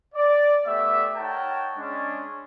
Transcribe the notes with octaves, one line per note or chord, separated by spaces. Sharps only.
D5
A3 B3 G4 D5 E5
D#4 A#4 C#5 F#5 G5 A5
G#3 C#4 D4